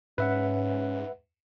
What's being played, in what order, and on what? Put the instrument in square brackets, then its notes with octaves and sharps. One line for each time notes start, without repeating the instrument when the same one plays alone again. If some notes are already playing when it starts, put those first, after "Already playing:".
[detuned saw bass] G#2 [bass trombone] C#4 [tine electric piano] B4 E5 F#5